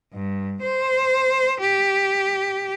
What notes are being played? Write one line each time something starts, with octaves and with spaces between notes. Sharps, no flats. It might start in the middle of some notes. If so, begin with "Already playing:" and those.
G2
C5
G4